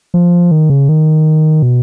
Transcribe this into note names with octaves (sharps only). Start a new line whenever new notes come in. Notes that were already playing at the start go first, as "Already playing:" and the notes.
F3
D#3
C#3
D#3
B2